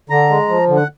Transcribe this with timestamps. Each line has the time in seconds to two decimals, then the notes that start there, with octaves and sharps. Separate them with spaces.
0.10 D3 A#5
0.29 G#3
0.49 F3
0.68 D3
0.76 F#5